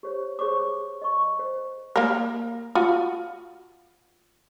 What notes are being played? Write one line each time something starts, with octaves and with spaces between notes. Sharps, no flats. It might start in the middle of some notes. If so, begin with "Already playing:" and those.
G4 C5 C#5
G#4 C5 C#5 C#6 D6
D#5 C#6
C5
A#3 A#4
F4 F#4